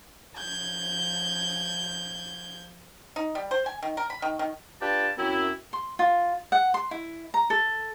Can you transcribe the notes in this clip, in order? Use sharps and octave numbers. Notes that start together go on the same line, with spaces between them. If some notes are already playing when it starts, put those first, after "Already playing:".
F3 G6 G#6
D#4
G3
C5
G#5
D#3
A#4
B5
D#3
D#3
D4 F4 G4 B4 G5 A5
F#2 C4 E4
C6
F4
F#5
C6
E4
A#5
A4